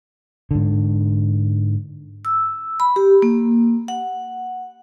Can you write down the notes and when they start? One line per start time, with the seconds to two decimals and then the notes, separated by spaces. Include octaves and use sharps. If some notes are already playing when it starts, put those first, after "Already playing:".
0.51 G#2 D3
2.25 E6
2.80 B5
2.96 G4
3.22 A#3
3.88 F#5